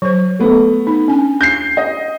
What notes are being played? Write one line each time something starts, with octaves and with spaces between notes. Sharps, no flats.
F#3 C5
A3 B3
D#4
C#4 D4 G#5
G6 C7
D#5